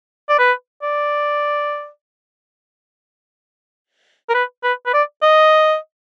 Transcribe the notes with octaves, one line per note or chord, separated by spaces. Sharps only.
D5
B4
D5
A#4
B4
B4
B4
D5
D#5